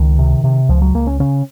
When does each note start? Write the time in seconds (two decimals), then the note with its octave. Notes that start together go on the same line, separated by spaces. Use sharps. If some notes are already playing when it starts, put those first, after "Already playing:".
Already playing: C#2 D#3
0.19 C3
0.44 C3
0.69 C#2 F3
0.82 F#3
0.94 C#2 A#3
1.07 C#4
1.20 C#3 C#4